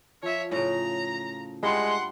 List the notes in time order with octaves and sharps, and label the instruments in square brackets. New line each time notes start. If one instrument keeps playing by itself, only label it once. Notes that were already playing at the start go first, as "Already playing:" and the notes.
[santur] F3 [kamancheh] C#5 E5
[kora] A2 C#3 [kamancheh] A#5
[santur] G3 E5 [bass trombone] G#3 [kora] D4 E4 F4 [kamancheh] F#5 C6